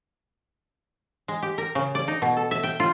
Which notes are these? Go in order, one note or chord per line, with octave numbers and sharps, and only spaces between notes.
G#3
G4
A#4
C#3
D5
D#4
B2
A4
E5
G5
F4